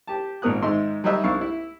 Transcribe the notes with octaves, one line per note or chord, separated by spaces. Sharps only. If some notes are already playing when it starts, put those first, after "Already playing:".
G4 A5
G#1 A#2 A#4 D#6 F#6
G#2 D#3 G#3 E5 C6
F#3 G3 D#4 D#5 E5
C2 D4 F5 C#6 E6
E4